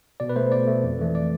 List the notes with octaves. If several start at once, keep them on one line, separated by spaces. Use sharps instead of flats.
B2 D5
B4
A3 C5
B2 D5
A3
F2
E3 A3
D5